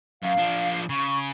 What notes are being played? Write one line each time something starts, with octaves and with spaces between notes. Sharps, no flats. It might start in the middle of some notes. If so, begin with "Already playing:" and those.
F#2 F5
F3 D4
C#3 C#6